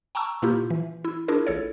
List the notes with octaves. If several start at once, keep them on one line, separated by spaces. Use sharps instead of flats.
G5 A5 A#5 C#6 E6
A#2 A#3 E4 F4 G4
E3
E4
D4 E4 F4 G#4 A#4
A1 A4 C#5